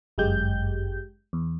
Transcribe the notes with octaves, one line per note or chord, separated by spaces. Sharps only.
G1 F#2 G#3 G4 G6
E2